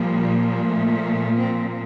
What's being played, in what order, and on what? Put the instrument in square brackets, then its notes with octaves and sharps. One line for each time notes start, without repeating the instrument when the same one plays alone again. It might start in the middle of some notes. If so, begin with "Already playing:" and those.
Already playing: [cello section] A#2 F3 G3
A3
C4